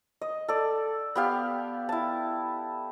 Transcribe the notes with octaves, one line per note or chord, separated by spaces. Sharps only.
D#5
A4 D5
B3 G4 F5
E4 A5